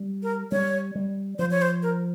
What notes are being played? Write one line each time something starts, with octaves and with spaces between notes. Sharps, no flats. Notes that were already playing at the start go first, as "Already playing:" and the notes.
Already playing: G3
A#4
G3 C#5
G3
F3 C5
C#5
C5
A#4